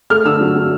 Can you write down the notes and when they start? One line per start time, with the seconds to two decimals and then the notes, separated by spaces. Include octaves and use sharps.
0.10 A3 F6
0.25 D3 E6
0.41 F#3
0.56 F#3